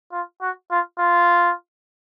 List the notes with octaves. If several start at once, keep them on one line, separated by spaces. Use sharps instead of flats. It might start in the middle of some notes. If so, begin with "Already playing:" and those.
F4
F#4
F4
F4